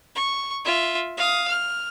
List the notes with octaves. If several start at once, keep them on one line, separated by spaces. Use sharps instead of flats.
C#6
F4 E5
F5 D#6
F6